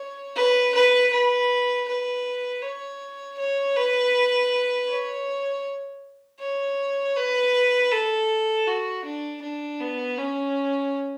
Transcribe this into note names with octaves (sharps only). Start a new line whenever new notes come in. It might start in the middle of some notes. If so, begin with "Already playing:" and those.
Already playing: C#5
B4
B4
B4
B4
C#5
C#5
B4
C#5
C#5
B4
A4
F#4
D4
D4
B3
C#4